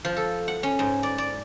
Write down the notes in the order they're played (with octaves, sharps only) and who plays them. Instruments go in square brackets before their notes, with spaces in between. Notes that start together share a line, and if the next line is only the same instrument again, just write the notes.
[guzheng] F3
A4
F#5
C#4
G#2
D5
D5